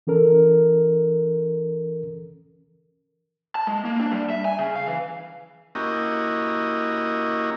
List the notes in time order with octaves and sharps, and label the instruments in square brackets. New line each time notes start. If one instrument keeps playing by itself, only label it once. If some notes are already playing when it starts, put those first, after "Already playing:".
[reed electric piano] E3 C#4 A4 A#4
[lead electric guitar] A5
G#3
A#3
D4
G3
E5
G#5
C#3
F5
E3
[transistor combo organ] A#3 C#4 E4 F#4 G4 D#5